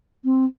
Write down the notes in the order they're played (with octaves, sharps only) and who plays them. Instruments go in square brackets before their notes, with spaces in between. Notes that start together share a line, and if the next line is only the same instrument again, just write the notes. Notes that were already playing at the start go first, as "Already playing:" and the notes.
[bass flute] C4